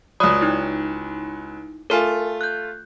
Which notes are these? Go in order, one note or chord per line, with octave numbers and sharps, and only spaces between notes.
C#2 F#3 D5 B5 D#6
D#4 E4
A3 F4 A#4 G#5
F#6 G6